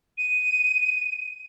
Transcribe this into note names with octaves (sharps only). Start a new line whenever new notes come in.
D#7